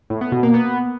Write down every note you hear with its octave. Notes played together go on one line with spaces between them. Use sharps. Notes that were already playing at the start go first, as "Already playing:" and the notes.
A2
B3
B2
A#3
B3